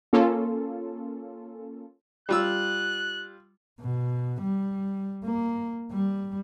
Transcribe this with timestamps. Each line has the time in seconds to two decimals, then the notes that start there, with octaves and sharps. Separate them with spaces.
0.13 A#3 C#4 F4 A4
2.29 G3 F4 E6 F#6
3.80 B2
4.42 G3
5.24 A#3
5.91 G3